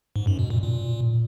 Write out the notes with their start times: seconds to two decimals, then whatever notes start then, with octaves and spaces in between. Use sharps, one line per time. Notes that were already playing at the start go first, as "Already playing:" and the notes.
0.16 G#2
0.27 F#2
0.39 B2
0.50 A#2
0.62 A#2